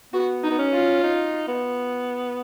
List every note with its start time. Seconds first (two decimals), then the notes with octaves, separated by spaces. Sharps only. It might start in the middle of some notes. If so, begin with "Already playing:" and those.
0.13 B3 F#4
0.44 D#4
0.51 B3
0.58 C#4
0.73 F4
1.03 D#4
1.48 B3